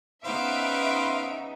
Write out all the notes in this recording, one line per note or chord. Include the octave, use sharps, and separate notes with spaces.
C#3 B3 D#4 B4 C5 E5 F5 D7